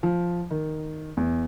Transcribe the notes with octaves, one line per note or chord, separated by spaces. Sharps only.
F3
D#3
E2